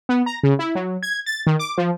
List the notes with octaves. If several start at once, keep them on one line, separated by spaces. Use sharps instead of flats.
B3
A#5
C#3
E4
F#3
G#6
A6
D#3
D6
F3